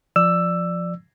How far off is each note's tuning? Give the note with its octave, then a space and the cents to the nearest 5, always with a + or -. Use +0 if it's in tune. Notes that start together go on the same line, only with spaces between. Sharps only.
F3 +0 D5 +10 E6 +10